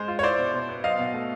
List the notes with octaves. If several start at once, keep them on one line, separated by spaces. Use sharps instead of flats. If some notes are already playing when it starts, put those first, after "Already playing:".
Already playing: G#3 C5
F4
C#5
E4 C5 D5
B2
B2
B3
F#3 D#5 F5
B2
A3